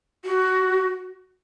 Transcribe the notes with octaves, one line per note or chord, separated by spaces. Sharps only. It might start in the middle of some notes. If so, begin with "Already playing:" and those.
F#4